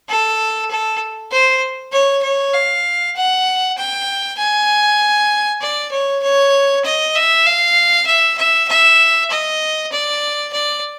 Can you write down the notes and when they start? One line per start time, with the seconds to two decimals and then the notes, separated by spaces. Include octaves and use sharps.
0.09 A4
0.71 A4
1.32 C5
1.92 C#5
2.23 C#5
2.54 F5
3.16 F#5
3.78 G5
4.38 G#5
5.61 D5
5.92 C#5
6.23 C#5
6.85 D#5
7.15 E5
7.46 F5
8.07 E5
8.38 E5
8.68 E5
9.31 D#5
9.92 D5
10.53 D5